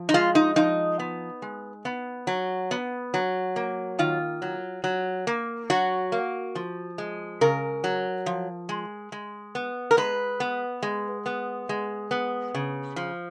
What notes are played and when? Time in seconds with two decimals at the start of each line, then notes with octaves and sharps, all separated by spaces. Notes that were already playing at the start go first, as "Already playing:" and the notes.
Already playing: F3
0.09 D#4
0.14 G#3 F4
0.35 D#4
0.56 F3 D#4
0.99 B3
1.42 G#3
1.85 B3
2.27 F#3
2.71 B3
3.14 F#3
3.56 A#3
3.99 D#3 F4
4.42 F#3
4.84 F#3
5.27 A#3
5.70 F#3 F#4
6.12 A#3
6.55 F3
6.98 G#3
7.41 C#3 A#4
7.84 F#3
8.26 F3
8.69 G#3
9.12 G#3
9.55 B3
9.91 A#4
9.97 G#3 B4
10.40 B3
10.83 G#3
11.26 B3
11.69 G#3
12.11 B3
12.55 C#3
12.96 F3